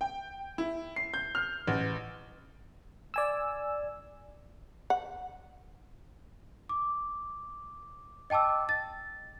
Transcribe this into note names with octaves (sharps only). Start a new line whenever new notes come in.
G5
E4
C7
G6
F6
A1
D5 G#5 E6
F#5
D6
D#5 G5 A5 D6 E6
A6